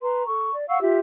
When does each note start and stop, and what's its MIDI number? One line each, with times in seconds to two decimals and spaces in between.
0.02 0.25 71
0.02 0.25 82
0.02 0.25 84
0.27 0.53 69
0.27 0.53 85
0.54 0.66 74
0.68 0.78 77
0.68 0.78 78
0.68 0.78 85
0.68 0.78 88
0.82 1.00 65
0.82 1.00 67
0.82 1.00 76